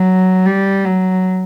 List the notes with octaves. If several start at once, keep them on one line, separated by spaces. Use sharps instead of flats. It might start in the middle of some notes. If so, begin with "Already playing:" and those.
Already playing: F#3
G3
F#3